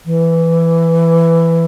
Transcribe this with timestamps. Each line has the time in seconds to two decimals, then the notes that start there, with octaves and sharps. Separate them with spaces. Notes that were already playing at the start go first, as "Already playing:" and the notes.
0.06 E3